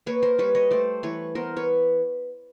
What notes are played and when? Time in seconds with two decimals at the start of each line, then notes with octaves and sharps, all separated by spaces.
0.06 A#3 B4 C#5
0.23 A#4 C5
0.38 G3 B4 C#5
0.55 C#5 D#5
0.71 A3 C5 D5
1.03 E3 B4 C#5
1.35 B3 A#4 C5
1.57 B4 C#5